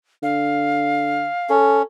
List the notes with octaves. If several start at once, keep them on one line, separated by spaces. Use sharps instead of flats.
D3 F5
C#4 A4